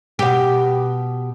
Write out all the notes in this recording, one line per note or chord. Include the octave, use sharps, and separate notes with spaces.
B2 G4